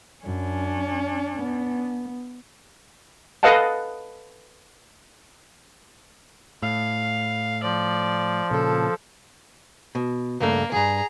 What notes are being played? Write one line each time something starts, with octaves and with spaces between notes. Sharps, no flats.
F#2 C#4 D4
B3
A4 B4 D#5 F5 F#5 A5
A2 F5
F3 D5
A#2 C#3 A4
B2
C#2 G2 A3 A#3
C2 G2 G#4 A#5